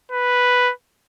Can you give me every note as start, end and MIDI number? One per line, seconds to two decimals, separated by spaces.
0.12 0.72 71